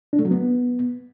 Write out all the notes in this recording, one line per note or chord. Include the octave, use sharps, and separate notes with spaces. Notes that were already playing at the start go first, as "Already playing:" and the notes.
D4
A3
F#3
B3